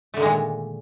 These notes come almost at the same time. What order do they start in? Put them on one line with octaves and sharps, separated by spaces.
A3 D3 D#3 G#3 A#2